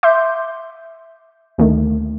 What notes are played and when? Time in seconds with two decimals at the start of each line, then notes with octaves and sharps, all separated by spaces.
0.03 E5 C6 D6 G6
1.58 D2 D#3 A3